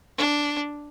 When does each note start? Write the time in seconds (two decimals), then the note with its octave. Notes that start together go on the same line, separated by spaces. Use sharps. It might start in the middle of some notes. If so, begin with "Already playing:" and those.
0.17 D4